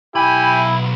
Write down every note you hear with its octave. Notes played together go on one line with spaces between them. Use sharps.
B1 E4 G4 G#5 B5